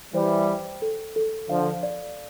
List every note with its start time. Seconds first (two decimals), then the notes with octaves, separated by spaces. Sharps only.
0.14 E3 G3 C5
0.47 G5
0.82 A4
1.16 A4
1.49 D3 F3 F5
1.83 D5